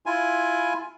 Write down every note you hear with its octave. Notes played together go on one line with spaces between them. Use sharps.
E4 F4 G#5